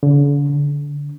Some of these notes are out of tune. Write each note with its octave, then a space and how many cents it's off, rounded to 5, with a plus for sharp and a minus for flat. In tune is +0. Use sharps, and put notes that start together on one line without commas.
D3 -45
D3 -20